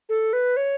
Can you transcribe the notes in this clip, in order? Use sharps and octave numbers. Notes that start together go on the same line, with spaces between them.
A4
B4
C#5